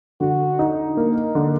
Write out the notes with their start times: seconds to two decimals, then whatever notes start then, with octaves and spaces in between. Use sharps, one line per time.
0.20 D3 F#4
0.59 D#4
0.97 A#3
1.35 D3